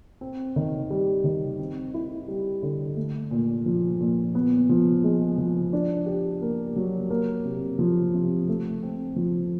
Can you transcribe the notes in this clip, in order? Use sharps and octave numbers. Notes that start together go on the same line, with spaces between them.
C4
D#3
G3
D#3
C4
E4
G3
D3
A3
A#2
F3
A#2
B3
F3
G#3
F3
D4
G4
A#3
F#3
A#3
C3
F3
C3
A3
C4
F3